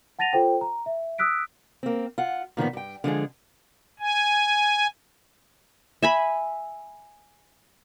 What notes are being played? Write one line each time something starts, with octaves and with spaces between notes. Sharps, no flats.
F#5 A5 A6 A#6 D#7 F7
F4 A4 C5 G5
A#5
E5
D#6 E6 F#6 B6 D7
A#3 C4
F4 F#5
A#2 D#3 F3 B3
G2 G5
D3 F3 G#3 G#4
G#5
E5 G#5 B5